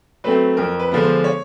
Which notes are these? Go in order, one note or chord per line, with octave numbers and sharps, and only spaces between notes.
F#3 A3 C4 B4
F2 A#4
B4
D3 F3 G#3 B3
C5
C#5